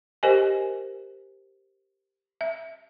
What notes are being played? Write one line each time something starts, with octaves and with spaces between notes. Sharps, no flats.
G4 A#4 C5 D#5 G#5
E5